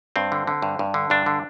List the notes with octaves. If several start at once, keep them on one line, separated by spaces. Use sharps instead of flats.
G2 C4
D3
D3
G2
G2
D3
G2 D4
D3